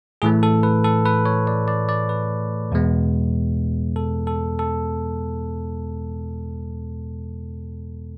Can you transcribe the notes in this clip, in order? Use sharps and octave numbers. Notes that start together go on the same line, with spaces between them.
A2 E3 A3 G#4
A4
B4
A4
B4
C#5
D5
D5
D5
B4
E2 B2 G#3 B3
A4
A4
A4